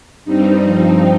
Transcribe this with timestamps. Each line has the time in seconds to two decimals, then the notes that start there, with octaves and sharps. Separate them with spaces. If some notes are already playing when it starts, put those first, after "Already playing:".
0.25 G2 G3 C4 D#4
0.64 G2 F3 C4